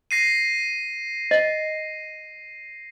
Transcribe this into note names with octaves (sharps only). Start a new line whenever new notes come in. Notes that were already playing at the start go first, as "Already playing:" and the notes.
A#6 C7 D#7
D#5